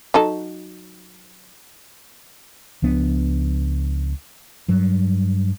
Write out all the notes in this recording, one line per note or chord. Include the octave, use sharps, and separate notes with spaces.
F#3 D#4 A4
C#2 F3 B3 D4
G2 F#3